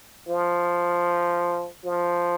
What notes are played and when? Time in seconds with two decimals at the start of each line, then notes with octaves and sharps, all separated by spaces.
0.29 F3
1.84 F3